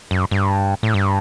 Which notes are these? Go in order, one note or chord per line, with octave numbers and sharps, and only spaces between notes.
F#2
G2
A2
G2